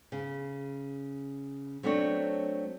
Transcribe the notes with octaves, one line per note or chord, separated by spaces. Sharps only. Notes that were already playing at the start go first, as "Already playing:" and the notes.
C#3
F#3 A3 C4 D4 C#5